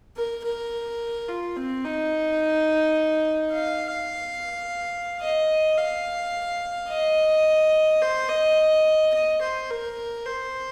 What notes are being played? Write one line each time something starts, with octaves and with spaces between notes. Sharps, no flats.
A#4
A#4
F4
C4
D#4
F5
D#5
F5
D#5
C5
D#5
D#5
C5
A#4
C5